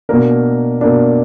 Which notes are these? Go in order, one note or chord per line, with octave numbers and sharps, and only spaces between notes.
B2 A#3 D4 A#4
B2 A#3 D4